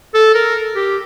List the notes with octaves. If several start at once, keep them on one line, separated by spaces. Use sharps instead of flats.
A4
A#4
G4